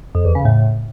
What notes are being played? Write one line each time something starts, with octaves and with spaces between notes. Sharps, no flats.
F2
E2
C#3
A2